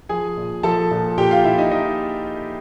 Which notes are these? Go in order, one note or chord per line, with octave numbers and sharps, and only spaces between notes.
F3 G#4 G#5
A#2
F3 A4 A5
A#2
A#2 G4 G5
F4 F5
A#2 E4 E5
D#4 D#5
F3 D#4 D#5